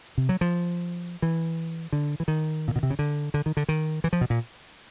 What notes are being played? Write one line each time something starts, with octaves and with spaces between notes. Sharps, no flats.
C3
F#3
F3
E3
D3
E3
D#3
A#2
B2
C3
C#3
D3
D3
D#3
D3
D#3
E3
F3
B2
A#2